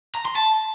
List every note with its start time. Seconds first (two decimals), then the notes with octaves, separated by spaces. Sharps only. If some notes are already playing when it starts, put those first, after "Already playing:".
0.15 A#5
0.25 C6
0.36 A5